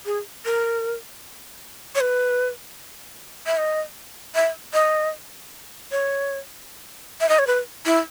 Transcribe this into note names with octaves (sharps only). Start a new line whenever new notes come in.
G#4
A#4
C#5
B4
E5
D#5
E5
D#5
C#5
E5
D#5
C#5
B4
E4